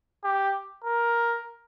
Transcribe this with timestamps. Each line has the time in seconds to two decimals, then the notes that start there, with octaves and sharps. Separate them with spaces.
0.24 G4
0.84 A#4